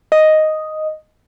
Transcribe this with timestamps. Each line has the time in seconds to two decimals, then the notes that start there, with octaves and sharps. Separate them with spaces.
0.12 D#5